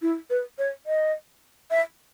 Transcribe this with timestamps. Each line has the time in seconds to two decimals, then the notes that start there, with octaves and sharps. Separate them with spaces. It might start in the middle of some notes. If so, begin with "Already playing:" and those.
0.02 E4
0.30 B4
0.58 C#5
0.86 D#5
1.71 E5